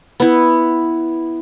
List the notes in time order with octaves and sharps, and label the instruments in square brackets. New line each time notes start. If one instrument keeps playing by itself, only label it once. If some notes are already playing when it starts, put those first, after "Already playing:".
[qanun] B3 E4